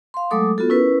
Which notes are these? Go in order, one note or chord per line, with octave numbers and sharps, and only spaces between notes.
F5 C6
F#3 G#3 A3 A4 D6 D#6
B3 F4 F#4 A4
C#4 E4 A#4 B4